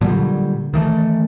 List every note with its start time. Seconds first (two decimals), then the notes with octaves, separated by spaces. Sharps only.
0.01 A#2 D3 F#3 G3
0.74 D#3 E3 A3